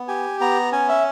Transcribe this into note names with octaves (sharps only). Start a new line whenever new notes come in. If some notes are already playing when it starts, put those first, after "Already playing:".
Already playing: B3
G4 G#5
B3 A#5
C#4 G#5
E5